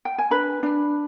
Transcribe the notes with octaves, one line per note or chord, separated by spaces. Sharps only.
G5
G#5
D4 B4 B5
D4